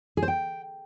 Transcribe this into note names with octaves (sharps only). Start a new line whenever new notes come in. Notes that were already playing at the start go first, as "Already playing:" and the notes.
G#4
C5
G5